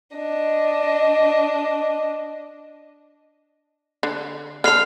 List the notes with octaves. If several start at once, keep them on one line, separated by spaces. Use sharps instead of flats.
D4 D#5
D3
D3 A4 F6 C7 F7